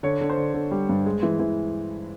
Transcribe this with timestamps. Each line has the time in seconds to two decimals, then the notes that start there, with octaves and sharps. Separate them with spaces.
0.03 D3 C#5
0.21 D3
0.30 C5
0.37 D3
0.54 D3
0.71 G3
0.89 G2
1.06 G#3
1.23 E3
1.40 E3